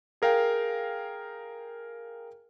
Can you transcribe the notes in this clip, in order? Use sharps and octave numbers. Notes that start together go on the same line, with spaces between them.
G#4 A#4 F5 G5